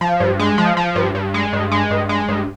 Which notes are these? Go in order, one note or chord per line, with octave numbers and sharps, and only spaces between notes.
F3
G2
G#3
F3
F3
G2
G2
G#3
G2
G#3
G2
G#3
G2